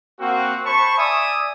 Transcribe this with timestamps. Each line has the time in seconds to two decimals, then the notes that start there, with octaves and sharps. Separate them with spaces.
0.20 A#3 C4 F#4
0.65 C5 A5 B5 C#6
0.97 D5 E5 G#5 D#6